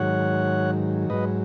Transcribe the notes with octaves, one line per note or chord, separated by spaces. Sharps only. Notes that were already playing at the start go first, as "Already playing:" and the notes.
Already playing: G#2 D#3 F#3 C#5 F#5
G#2 F#3 B4 D#5